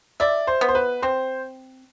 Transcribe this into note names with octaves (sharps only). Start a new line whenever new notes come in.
D5 E5
C5
B3
C5
B4
C4 C5